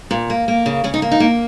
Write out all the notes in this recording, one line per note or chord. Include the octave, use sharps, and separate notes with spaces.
A#2
A#3
A#3
C#3
C#3 C#4
D#4
A#3
D#4
A#3